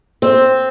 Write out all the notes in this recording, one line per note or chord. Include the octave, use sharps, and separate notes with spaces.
C4